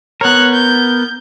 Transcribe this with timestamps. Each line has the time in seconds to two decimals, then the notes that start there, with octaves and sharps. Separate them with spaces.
0.21 B3 A#4 C#5 F#6
0.53 G6